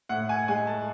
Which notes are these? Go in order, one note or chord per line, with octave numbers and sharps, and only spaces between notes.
A2 F#5
G#5
G#3 G#5
A5